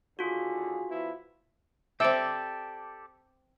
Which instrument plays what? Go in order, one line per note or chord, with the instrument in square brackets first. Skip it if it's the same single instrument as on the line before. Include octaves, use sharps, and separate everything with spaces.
[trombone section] D#2 D3 G#4 [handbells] F4 F#4
[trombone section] F3 B3 E4
[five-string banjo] C4 E5 [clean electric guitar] G4 A4 D5